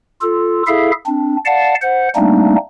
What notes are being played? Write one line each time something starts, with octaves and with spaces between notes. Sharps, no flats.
F4 A4
E4 G#4 A4 E5 F5
C4 D4
D5 F5 F#5 A5
C5 F#5
G3 A3 A#3 C4 D4 D#4